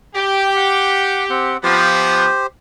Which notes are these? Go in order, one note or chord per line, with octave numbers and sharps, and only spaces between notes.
G4
F#5
C4 F#5
F3 B3 G4 C5